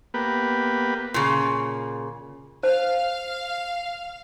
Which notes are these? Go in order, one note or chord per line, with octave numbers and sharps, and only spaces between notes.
A#3 B3 G4 B4
A#2 C#3
C5 F5 A5